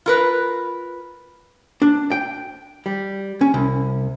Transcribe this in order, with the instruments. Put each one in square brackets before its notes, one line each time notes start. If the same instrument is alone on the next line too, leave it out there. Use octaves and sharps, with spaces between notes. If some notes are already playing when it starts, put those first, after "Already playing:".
[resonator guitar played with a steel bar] F4 A#4 B4
[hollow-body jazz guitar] D4
G5
G3
C#4
C2